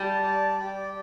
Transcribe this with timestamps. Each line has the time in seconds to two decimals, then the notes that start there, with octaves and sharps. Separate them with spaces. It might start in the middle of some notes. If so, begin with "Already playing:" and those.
Already playing: G3 A5
0.24 D5
0.59 G4